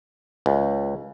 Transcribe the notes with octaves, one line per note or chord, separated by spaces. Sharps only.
C#2